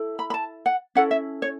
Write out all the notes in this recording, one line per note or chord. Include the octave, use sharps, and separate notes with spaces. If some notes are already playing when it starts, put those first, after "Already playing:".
Already playing: E4 A4
B5
B5
A5
F#5
C#4 E4 A4 F#5
E5
C#5